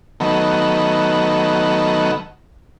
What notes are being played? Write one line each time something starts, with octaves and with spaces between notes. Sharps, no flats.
D#3 F#3 A3 B3